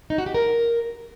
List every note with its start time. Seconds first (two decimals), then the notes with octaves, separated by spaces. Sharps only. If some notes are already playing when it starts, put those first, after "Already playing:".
0.10 D#4
0.18 F#4
0.26 G4
0.34 A#4